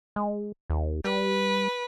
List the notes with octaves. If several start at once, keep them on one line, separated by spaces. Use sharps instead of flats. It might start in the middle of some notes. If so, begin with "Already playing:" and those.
G#3
D#2
G3 B4